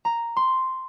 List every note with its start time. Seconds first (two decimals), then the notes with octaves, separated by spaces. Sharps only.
0.05 A#5
0.37 C6